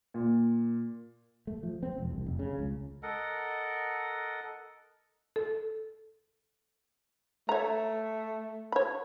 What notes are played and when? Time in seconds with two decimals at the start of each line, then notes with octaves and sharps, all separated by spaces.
0.14 A#2
1.47 A3
1.63 F3
1.83 C4
1.98 E1
2.11 C2
2.26 F1
2.39 C#3
2.59 C#2
3.03 A4 A#4 D#5 F#5
5.36 A4
7.49 A3 C#5 A#5
8.72 C#5 B5